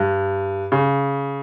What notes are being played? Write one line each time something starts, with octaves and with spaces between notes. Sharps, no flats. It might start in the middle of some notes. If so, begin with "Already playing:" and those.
Already playing: G2
C#3